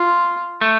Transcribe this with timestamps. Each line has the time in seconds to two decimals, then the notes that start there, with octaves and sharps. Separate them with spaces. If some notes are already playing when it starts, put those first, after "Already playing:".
Already playing: F4
0.61 A3